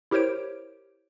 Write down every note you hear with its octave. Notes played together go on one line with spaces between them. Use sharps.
E4 G4 A#4 C5 C#5 D7